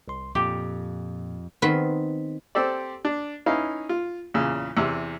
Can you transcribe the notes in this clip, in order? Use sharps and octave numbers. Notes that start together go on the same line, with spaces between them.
C2 C6
F2 A#2 G4
D#3 B3 C4 B4
C4 G4 A4 D5
D4
C#4 D#4 E4 B4 F5
F4
E2 A#2 C#3
E2 C3